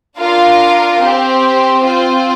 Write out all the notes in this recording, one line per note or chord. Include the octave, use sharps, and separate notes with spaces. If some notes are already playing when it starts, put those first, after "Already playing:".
D4 F4 A#4 F5
C4 G4 C5
C4 F4 C5